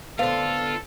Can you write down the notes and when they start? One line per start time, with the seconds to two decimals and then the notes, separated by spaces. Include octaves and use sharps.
0.19 D3 B3 F4 A4 C5 F5